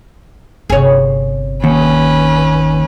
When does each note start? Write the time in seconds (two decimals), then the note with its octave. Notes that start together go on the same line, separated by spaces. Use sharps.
0.70 G1 C3 G#4 C#5
1.64 D#2 C#4 B4